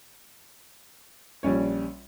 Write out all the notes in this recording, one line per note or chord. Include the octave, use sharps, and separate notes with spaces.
A#1 G3 C#4 C#5